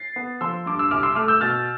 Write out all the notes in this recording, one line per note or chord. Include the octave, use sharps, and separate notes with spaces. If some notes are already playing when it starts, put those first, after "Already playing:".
Already playing: A6 C7
B3
F3 C6 E6
G2 D6
E6
C2 D6 F6
C6 E6
A3 D6 F6
E6 G6
B2 F6 A6